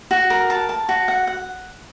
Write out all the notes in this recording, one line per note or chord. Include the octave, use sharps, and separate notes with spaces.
F#4
A#4
A5
A5
F#4
F#5
F#5